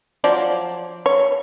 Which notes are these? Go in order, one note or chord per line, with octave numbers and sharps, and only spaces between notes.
F3 F#3 D5
C#5